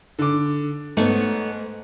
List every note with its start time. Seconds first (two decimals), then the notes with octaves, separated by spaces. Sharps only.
0.19 D3 D6
0.97 G#2 A3 B3 C#5